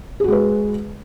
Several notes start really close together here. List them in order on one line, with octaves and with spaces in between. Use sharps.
G#4 F#4 G#3 B4